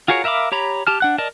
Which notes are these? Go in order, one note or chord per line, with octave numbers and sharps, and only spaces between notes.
F4 F#4 G#4 A#4 C#5
A#4 E5 F5 B5 D6
G4 C#5 A#5 B5
G4 A5 F6
D4 F#5 F#6
A#4 D5 D#5 A5